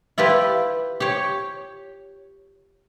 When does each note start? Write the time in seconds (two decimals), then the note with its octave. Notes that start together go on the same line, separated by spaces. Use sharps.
0.18 E4 F4 G4 B4
1.00 G4 C#5